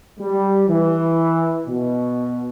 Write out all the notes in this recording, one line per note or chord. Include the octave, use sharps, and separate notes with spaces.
G3
E3
B2